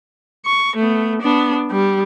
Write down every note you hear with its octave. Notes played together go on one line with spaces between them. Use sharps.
C#6
A3 B3
B3 D4
G3